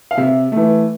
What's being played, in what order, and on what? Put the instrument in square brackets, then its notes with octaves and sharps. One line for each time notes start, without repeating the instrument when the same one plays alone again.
[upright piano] F5
C3 E5
E3 A3